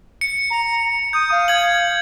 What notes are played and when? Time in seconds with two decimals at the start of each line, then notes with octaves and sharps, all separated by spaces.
0.21 C#7
0.50 A#5
1.13 D#6 G6
1.31 F5
1.48 G#6 F#7